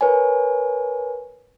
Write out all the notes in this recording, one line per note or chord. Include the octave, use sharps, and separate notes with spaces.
A#4 B4 C#5 G#5